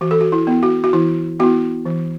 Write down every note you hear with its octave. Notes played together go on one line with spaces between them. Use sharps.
E3 F#4
A4
F#4
E4
B3 E4
F#4
F#4
E3 E4
B3 E4 F#4
E3